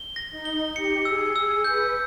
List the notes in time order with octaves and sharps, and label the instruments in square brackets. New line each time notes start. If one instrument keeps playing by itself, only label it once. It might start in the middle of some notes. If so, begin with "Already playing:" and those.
Already playing: [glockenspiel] G7
A#6
[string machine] D#4
[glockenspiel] G7
[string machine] G4 [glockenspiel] C#7
[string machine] G#4 [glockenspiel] E6
[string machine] G#4 [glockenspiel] E6
[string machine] B4 [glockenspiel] G6